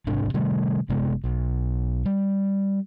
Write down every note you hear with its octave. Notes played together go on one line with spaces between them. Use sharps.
G#1 G#2 C3 D4
C3 D#3 G3 A3
F#1 C3 G#3 B3
B1
G3